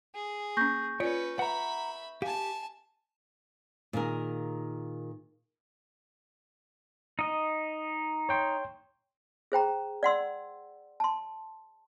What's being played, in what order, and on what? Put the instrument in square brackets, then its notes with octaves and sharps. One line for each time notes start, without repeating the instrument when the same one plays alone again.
[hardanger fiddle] G#4
[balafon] A#3 C#4 [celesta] C#6 G6 A#6
[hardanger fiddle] C#4 B4 [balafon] F4 D5 [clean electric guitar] C#5
[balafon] B4 [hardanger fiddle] E5 B5 [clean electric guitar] F#5 A#5
[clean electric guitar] G4 [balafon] F5 [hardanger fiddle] G#5 A5
[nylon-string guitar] A#2 D#3 G#4 A#4
[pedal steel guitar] D#4 D#5
[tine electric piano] C#5 G5 C6
[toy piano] G#4 C5 G5 A#5
D5 F#5 C6 E6
A5 C6